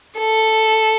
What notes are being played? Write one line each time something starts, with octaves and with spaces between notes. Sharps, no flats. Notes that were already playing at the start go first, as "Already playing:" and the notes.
A4